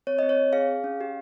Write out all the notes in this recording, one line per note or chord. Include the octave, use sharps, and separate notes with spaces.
C4 C#5
C4 D#5
C#5
C4
G#4 F5
G#4
C#4
G4